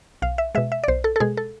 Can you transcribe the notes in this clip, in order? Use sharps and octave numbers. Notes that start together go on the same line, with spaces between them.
B1 F5
E5
B2 G#3 E5
E5
D5
B1 C5
A4
A4
B2 G#3 G#4
A4